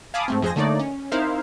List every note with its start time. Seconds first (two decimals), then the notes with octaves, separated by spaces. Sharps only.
0.14 F5 G#5 A5 B5 D6 D#6
0.28 G#2 A3 C4
0.42 F2 F3 G#4 C5 G#5 A#6
0.56 D3 A3 A#3 D#4 C#5 D5
0.79 C#4
1.12 C4 D#4 E4 A#4 C5 F5